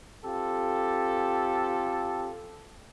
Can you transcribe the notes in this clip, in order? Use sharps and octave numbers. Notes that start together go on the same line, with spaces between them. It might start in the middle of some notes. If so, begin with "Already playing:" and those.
C4 F4 G4 A4